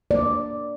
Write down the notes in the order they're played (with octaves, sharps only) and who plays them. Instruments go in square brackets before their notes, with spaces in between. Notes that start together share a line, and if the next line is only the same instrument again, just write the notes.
[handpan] A#3 D5